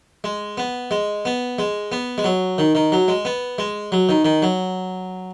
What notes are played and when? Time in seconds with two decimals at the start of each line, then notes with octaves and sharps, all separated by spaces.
0.24 G#3
0.58 B3
0.91 G#3
1.25 B3
1.59 G#3
1.92 B3
2.18 G#3
2.24 F#3
2.58 D#3
2.75 D#3
2.92 F#3
3.08 G#3
3.25 B3
3.58 G#3
3.92 F#3
4.09 D#3
4.25 D#3
4.42 F#3